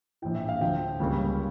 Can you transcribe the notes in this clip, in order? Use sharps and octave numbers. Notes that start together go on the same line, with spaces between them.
A#1 A2 E3 G5
E5
F5
D2 D3 F3 G5
C#2 C#3 G3 A#3 C#4